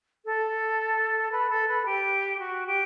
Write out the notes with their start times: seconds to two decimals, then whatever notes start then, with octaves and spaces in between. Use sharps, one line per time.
0.25 A4
1.31 B4
1.49 A4
1.68 B4
1.85 G4
2.39 F#4
2.66 G4